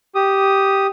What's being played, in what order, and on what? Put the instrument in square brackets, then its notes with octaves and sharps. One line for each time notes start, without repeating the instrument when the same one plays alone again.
[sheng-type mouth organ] G4 D#6